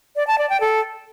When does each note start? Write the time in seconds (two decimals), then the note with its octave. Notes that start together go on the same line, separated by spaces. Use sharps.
0.16 D5
0.27 A5
0.38 D5
0.49 G5
0.61 A4